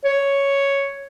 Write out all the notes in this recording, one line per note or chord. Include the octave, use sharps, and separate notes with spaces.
C#5